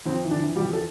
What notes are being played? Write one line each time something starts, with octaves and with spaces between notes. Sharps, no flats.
F2 C4
E3
D3 D4
E3
G3 G4
F2
A4